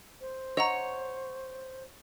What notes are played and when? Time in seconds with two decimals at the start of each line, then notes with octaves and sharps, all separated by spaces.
0.21 C5
0.57 C#5 D#5 F#5 A#5